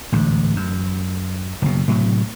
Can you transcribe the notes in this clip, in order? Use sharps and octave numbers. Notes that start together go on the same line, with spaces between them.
A1 D2 G#2
F#2
F#1 B2
A2 C3 F#3